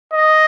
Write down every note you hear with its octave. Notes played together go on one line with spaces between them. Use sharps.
D#5